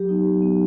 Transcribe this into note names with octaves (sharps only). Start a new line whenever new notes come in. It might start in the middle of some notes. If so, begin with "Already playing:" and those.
Already playing: F#3 G4
B3 D#4
F#3
B3 D#4